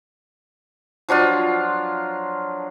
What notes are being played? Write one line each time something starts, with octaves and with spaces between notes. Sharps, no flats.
F3 F#3 D4 F4